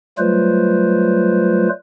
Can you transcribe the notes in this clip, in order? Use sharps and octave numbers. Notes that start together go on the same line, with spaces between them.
F#3 G3 A3 F4 B4 C5